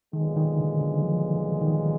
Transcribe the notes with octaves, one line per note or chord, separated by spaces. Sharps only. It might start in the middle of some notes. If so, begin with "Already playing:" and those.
B1 A#2 D#3 G#3
D#3
D3
D3
F3
D#3